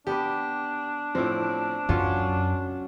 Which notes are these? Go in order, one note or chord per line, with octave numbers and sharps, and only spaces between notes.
B3 D4 G4 B4
A2 F3 C4
F#2 F#3 C#4 F4